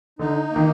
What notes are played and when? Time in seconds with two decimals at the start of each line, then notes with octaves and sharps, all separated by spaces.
0.19 D3 D#4
0.50 A#3
0.56 D#3